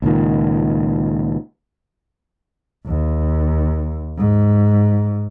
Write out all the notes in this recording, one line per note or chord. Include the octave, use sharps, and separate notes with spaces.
C#2 A#2 D#3
D#2
G#2